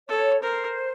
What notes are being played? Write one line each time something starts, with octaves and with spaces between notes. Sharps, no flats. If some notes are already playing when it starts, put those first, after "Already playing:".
A4 C#5
A#4 C5